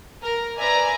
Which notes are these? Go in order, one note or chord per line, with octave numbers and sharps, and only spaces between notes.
A#4
B4 D5 E5 G#5 A#5